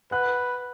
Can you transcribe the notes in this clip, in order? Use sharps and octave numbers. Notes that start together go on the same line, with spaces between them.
B4 F#5 F#6